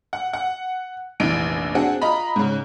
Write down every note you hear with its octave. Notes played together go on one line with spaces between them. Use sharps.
F#5
F#5
F1 A#1 E3 D7
C4 D4 F#4 G#4 F#5
F4 D#5 A#5 B5
G#2 C#3